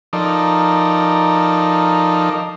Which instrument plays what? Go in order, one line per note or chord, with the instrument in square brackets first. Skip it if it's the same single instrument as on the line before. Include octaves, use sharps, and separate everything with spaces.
[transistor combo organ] F3 D#4 A4 A#4 D5